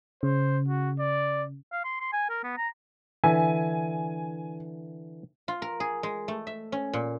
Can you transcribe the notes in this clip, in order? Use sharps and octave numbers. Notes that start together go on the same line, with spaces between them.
C#3 C5
F#4
D5
F5
C6
C6
G#5
A#4
B3
A#5
D3 E3 E5 G#5
F4
A#4
G#4
G#3
A3
E5
C#4
A#2